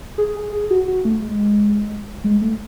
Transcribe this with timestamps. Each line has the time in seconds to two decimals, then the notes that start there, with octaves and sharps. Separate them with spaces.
0.18 G#4
0.36 G#4
0.52 G#4
0.70 F#4
0.88 F#4
1.05 A3
1.22 G#3
2.24 G#3
2.42 A3